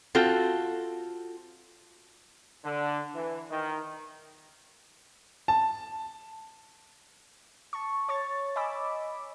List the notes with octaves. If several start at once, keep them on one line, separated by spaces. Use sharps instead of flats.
C4 F4 F#4 A4
D3
E3
D#3
A5
A5 C#6
C#5 C#6 A6
D#5 G#5 B5 D6 E6